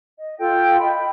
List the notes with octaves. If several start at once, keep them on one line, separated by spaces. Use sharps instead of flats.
D#5
F4 A4 G5
D#5 G5 B5